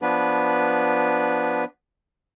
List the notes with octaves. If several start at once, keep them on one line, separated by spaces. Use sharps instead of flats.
F3 B3 D4 B4